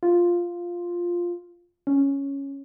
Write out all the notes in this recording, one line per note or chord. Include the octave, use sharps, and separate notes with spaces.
F4
C#4